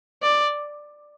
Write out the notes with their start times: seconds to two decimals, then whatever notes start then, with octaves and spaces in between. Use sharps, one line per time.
0.23 D5